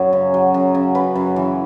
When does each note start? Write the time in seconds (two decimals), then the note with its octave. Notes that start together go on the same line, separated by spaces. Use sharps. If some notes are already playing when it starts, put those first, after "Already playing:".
Already playing: F#2 F#3 C#5
0.13 C#3
0.34 F#3
0.54 F#2
0.75 C#3
0.95 F#2 B4
1.15 F#2
1.36 E3